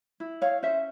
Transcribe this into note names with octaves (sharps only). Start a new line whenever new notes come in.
E4
C#5 F5
C#4 C5 E5